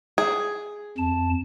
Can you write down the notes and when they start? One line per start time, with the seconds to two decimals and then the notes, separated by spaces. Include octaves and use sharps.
0.18 G#4
0.98 F2 A5